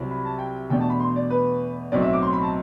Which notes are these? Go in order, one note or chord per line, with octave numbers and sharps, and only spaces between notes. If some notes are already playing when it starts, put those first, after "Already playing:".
Already playing: C2 C3 F#3 C4 E4
B5
A5
G5
E2 B2 A3 D4 G5
A5
B5
C6
D5
B4
B1 A2 F#3 C4 D5
E5
D6
C6
B5
A5